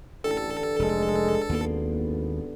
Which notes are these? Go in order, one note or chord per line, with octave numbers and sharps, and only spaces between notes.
A1 D3 E3 G4 A4
F1 G#3
G#1 D#2 A#3 B3 A5 C6